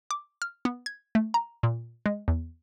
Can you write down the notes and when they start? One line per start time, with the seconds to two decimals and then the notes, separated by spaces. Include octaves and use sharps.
0.11 D6
0.42 F6
0.65 B3
0.86 G#6
1.15 A3
1.34 A#5
1.63 A#2
2.06 G#3
2.28 E2